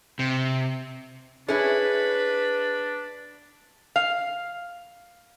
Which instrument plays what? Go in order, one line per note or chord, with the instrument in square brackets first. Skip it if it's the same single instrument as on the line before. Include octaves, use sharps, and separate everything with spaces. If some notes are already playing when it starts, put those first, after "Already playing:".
[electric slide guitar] C3
[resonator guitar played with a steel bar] C#4 E4 [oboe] D4 [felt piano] G#4 [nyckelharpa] B4 B5
[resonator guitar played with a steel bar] F5